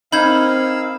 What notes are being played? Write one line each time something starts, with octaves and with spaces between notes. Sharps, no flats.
A#3 C4 D#4 F5 B5 E6 G6 G#6